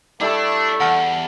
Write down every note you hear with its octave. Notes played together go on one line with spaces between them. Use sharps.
G3 A3 D4 E4 A4
E2 F#5 A5 F6